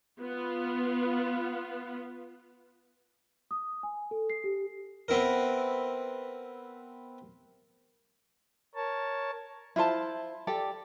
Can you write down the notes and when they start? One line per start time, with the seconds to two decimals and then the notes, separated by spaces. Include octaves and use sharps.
0.21 B3 F4
3.51 D#6
3.83 G#5
4.11 A4
4.30 C7
4.44 G4
5.08 B3 C4 E4 A#4
8.75 A#4 C#5 A5
9.76 E4 F4 C5 A5
10.47 G4 A4 D5